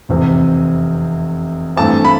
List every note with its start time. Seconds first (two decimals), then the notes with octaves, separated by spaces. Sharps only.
0.09 F1 E2 C3
1.76 G2 E3 A3 C4 A5
2.04 B5